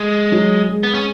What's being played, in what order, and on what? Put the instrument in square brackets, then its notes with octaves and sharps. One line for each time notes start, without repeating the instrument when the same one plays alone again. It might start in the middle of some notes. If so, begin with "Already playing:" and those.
Already playing: [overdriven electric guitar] G#3
[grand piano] F#3
G#3
[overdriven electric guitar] B3
C#4